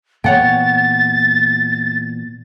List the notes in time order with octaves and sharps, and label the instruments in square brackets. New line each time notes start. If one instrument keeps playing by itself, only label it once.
[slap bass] A#2 E3 B3 [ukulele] C#5 F#5 G5 [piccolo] A6